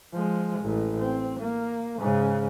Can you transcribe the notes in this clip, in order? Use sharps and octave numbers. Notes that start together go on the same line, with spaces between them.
F3 G#3
A1
C4
A#3
G#2 C#3